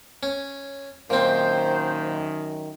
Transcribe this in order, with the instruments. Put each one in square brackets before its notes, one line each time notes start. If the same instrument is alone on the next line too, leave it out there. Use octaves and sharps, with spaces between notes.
[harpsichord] C#4
[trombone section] F#2 D#3 [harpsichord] A#2 C4 [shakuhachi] C5